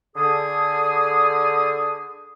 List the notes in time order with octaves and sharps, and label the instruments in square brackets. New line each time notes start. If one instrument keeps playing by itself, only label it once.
[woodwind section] D3 G#4 D#6